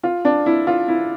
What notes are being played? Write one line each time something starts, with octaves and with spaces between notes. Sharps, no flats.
F4
D4
E4
F4
E4